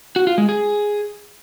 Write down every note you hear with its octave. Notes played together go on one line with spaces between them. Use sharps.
F#4
F4
G#3
G#4